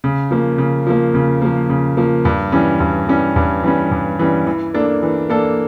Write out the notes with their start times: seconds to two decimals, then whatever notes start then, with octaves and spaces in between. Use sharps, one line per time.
0.04 C#3
0.31 F3 A#3
0.58 C#3
0.87 F3 A#3
1.14 C#3
1.42 F3 A#3
1.69 C#3
1.97 F3 A#3
2.25 G2
2.52 E3 G3 C#4
2.80 G2
3.08 E3 G3 C#4
3.36 G2
3.64 E3 G3 C#4
3.91 G2
4.19 E3 G3 C#4
4.47 E3
4.74 A#3 D4 A4
5.03 E3
5.30 A#3 D4 A4